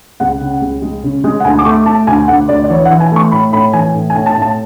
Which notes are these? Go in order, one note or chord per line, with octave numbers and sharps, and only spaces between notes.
C#2 F#5
C#3
C#2
G#3
C#3
G#3
F#5
D2 G#5
D6
A3 C#6
A3 A5
D2 G#5
D2 F#5
D2 D5
D5
E3 C#5
F#5
E3
G#5
A3 C#6
A2 B5
A2 B5
E3 G#5
A2
G#5
A2
A5
A2
A5